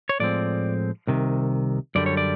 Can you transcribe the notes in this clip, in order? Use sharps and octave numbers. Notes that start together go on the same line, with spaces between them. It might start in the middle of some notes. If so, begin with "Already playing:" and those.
C#5
A2 F3 G#3 C4 D5
C2 C3 D#3
F#2 D3 G3 D5
C#5
D5